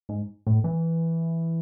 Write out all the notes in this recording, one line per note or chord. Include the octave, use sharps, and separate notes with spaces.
G#2
A2
E3